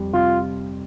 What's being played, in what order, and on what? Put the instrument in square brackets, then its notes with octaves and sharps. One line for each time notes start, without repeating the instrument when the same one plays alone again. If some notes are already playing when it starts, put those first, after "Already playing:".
Already playing: [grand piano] F2 G3
[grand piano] C3 [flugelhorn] F4